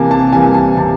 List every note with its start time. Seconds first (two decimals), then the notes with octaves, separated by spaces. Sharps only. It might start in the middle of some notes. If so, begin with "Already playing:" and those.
Already playing: C3 E3 A#3 G#5 A5
0.11 A5
0.33 E3 G3 A#3 G#5
0.54 A5
0.77 C3 A5